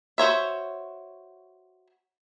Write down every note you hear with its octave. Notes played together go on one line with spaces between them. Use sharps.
F#4 C5 C#5 E5